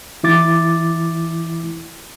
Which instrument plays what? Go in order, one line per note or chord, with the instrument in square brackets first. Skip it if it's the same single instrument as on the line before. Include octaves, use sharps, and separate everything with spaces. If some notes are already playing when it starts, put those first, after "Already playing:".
[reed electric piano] E3 E4 D6 A6